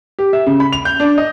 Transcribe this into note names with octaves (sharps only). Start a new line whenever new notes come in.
G4
E5
C#3
B5
F7
G6
D4
D#5